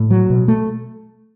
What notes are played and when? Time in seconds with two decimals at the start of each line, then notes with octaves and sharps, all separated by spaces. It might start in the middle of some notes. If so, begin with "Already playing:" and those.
Already playing: A2
0.11 F#3
0.30 B2
0.48 A3